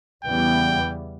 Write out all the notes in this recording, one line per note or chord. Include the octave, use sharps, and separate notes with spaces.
E2 C#3 E3 G3 B3 G5